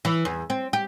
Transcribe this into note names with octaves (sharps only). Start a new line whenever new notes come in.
E3
E2
C4
G4